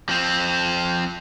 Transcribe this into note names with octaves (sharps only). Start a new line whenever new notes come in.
F3 C4